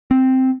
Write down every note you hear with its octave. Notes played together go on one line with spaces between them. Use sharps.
C4